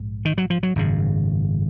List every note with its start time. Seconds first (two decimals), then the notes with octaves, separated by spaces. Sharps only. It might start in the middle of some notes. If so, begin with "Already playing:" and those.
Already playing: A#1 G#2
0.25 D#3
0.38 F#3
0.50 F3
0.63 F#3
0.76 G#1 F#2 C#3